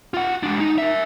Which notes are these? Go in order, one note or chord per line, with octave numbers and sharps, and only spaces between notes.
F4 F#5
G#3 D4
D#4
A#4 E5